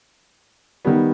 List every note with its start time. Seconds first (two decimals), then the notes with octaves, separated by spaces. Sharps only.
0.85 D#3 G3 B3